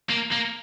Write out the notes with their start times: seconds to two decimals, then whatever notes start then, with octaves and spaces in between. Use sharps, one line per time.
0.10 A#3
0.32 A#3